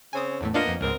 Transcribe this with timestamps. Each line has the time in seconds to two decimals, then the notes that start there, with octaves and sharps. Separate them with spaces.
0.13 C#3 C4 C#5 G#5 D#6
0.41 E2 A2 A3
0.54 A#3 B3 D4 F4 A#4 D#5
0.67 F2
0.81 C#2 G#2 B3 C4 A#4